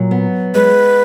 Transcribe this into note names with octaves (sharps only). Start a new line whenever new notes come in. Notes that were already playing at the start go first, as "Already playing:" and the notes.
Already playing: A#2 F#3
B3
G#3 B4